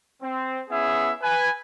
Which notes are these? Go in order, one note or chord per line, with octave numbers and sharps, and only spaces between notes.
C4
B3 C#4 E4 G#4 E5
B4 G#5